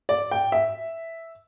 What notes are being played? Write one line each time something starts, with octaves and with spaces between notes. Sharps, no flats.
D5
G5
E5